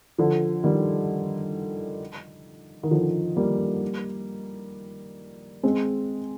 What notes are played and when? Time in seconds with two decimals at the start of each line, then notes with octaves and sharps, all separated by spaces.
0.18 D3 F3
0.64 D#3 G3
2.83 D#3
2.91 D3 F3
3.37 G3 A#3
5.63 G#3 C4